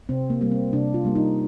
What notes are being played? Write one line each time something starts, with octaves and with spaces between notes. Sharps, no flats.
C3 C4
A#3
G3 A#3
C4
C3 D4
F4
G3 A#3
D#4